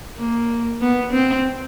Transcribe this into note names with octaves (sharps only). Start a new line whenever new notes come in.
A#3
B3
C4